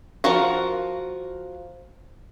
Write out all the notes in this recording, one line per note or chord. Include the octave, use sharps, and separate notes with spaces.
F3 F4 F#4 A#4